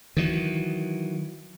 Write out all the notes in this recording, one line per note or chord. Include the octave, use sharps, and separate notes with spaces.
D#3 E3 F#3